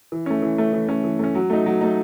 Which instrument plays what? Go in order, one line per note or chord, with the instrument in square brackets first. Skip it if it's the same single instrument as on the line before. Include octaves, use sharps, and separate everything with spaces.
[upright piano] E3
A3 C#4
E3
A3 C#4
E3
A3 C#4
E3
A3 C#4
F#3
A3 D#4
F#3
A3 D#4